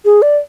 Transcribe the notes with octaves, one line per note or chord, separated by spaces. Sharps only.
G#4
D5